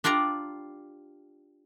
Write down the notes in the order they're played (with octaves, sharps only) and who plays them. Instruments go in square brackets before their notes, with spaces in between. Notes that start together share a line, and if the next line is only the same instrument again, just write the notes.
[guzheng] D4 F4 G4 D5 A#5